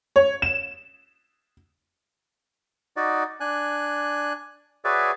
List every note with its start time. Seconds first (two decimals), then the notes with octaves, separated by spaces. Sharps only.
0.16 C#5
0.42 E7
2.97 D#4 F#4 D5
3.40 D4 G#5 F#6
4.85 F#4 G#4 B4 C#5 D5 E5